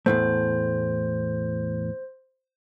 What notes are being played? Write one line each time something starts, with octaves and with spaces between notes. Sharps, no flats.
E2 A2 A3 C5